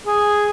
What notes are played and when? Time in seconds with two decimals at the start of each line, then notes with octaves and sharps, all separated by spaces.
0.06 G#4